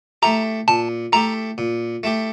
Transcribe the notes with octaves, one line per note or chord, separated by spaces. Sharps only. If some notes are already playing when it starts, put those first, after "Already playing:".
A3 E4 G4 A#5
A#2 A5
A3 E4 G4 A#5
A#2
A3 E4 G4